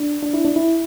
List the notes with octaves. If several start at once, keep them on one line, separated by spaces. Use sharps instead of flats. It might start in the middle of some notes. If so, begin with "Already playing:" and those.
Already playing: D4
D4
E4
D4
E4